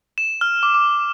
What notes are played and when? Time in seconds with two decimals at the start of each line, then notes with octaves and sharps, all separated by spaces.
0.18 E7
0.41 F6
0.63 D6
0.74 D6